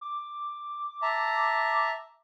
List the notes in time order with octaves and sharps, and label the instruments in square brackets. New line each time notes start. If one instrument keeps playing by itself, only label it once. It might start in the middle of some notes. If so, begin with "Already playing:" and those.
[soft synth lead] D6
[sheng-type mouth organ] E5 A5 A#5